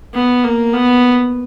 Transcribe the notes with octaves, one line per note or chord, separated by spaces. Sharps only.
B3
A#3
B3